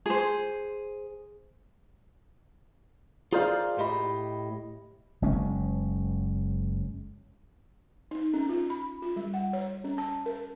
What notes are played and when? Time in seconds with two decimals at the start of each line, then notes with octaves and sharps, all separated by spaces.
0.06 G#4 C5
3.33 F4 G#4 A#4 C5 D5 F5
3.78 A2 G4 D#5 B5
5.22 F#1 G#3 C#4
8.11 D#4
8.34 C#4
8.49 F4
8.70 B5
9.02 F4
9.16 G3
9.34 F#5
9.53 C#5
9.84 C#4
9.98 A5
10.26 A#4